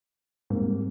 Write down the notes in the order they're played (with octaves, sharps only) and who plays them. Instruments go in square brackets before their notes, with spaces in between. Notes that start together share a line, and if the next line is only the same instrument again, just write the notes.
[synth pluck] G#2 [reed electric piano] G3 A#3 C4